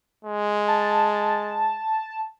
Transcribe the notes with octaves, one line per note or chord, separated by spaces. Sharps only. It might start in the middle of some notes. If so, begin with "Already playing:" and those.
G#3
A5